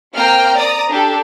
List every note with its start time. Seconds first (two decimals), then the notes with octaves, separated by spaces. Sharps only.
0.14 A#3 C4 G5 A#5 F6
0.57 D5 A#5 D#6
0.88 D4 G4 A4